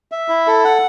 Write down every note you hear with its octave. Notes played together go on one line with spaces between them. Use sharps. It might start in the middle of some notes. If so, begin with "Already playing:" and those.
E5
E4
A4
F#5